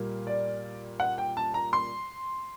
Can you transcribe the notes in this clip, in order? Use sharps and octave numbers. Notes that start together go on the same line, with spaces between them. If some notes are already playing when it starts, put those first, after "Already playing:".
Already playing: A#2 G3 A#3
D5
F#5
G5
A5
A#5
C6